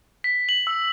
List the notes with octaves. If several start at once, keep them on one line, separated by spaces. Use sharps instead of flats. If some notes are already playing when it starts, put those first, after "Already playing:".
B6
F#7
E6